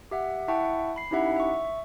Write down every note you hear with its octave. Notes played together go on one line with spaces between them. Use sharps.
G4 E5 F#5
E4 E5 F#5 G5 A5 C#6
B5 C7
C#4 D#4 E4 G4 E5 F#5
E5 C#6